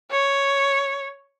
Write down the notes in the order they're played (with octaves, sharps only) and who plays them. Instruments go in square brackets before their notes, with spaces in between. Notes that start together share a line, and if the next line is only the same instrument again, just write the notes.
[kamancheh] C#5